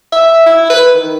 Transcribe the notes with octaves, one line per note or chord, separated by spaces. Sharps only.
E5
E4
B4
D#3